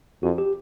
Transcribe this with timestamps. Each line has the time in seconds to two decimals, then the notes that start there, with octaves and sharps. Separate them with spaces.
0.23 F2 F#4
0.38 G4